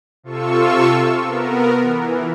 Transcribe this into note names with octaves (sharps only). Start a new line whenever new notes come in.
C3 F4 A4 C#6 E6
B3 A#4
E3